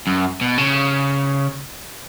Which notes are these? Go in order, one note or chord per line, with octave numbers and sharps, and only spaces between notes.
F#2
B2
C#3